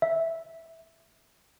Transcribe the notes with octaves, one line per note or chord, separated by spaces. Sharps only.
E5